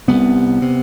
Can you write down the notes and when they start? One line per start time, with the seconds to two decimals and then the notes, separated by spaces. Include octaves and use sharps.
0.08 C2 C3 B3
0.62 C3